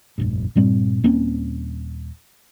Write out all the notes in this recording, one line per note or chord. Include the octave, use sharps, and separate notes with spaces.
F1 A#1 G2
G2 A#2 G3 C4
D#1 A#3 C4 C#4